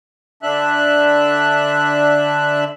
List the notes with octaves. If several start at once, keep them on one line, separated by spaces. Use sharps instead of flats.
D3 D4 E5 F#6